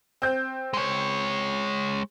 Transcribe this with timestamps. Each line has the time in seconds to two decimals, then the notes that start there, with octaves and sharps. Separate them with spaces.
0.22 C4 G6
0.73 G#3 C#5